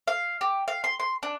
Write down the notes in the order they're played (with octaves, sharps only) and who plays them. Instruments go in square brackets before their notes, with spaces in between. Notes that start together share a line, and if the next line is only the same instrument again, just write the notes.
[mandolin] F5
G4
F5
C6
C6
D4